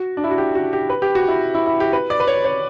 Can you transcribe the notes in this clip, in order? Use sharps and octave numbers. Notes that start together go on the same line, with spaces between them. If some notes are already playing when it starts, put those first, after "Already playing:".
Already playing: F#4
D4
E4
F#4
G4
F#4
G4
B4
G4
F#4
E4
E4
E4
G4
B4
D5
B4
C#5
C#5